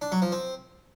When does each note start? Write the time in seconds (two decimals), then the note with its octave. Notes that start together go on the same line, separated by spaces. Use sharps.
0.02 D4
0.12 F#3
0.22 F3
0.32 C4